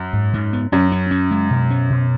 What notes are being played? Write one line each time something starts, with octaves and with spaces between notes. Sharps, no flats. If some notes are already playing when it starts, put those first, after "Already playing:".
Already playing: F#2
G#2
G#2
B3
F#2 C#4
C#4
C#4
G#3
B2
C#4
B2